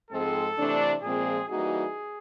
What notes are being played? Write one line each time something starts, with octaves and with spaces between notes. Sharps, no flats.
G#2 F3 G#3 C4 A4
C3 E3 A3 D4
A#2 F3 G#3 C4 G#4
E3 G3 A#3 D#4 F#4 G#4